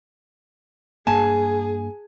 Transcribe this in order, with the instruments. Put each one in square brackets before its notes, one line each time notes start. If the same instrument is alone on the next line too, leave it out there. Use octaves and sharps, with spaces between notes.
[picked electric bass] G2 A#3 [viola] G#4 [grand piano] G#5 [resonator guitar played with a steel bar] A5